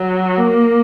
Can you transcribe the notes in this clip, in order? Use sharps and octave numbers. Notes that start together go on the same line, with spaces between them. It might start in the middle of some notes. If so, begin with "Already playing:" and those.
Already playing: F#3
A#3